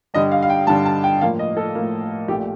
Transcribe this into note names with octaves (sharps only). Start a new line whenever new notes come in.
G2 D3 G3 D#5
F5
F5
G5
G2 D3 G3 A5
A5
G5
A2 F3 A#3 F5
D#5
A4
A2 F3 A#3
A#1 A#2 A3 G4